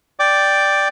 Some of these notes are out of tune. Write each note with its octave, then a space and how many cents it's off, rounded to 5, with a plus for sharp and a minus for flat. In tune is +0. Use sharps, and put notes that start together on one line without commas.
D5 +0 G5 +0 D6 +0